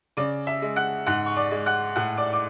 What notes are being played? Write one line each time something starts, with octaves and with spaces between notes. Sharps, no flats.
C#3 D5 D6
E5 E6
G#3
F#5 F#6
G#2 F#5 F#6
C#6
D5 D6
G#3
F#5 F#6
A2 F#5 F#6
D5 D6
D6